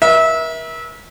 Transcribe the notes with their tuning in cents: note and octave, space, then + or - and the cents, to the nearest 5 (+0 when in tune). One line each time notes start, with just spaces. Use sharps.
A#4 +40 E5 -25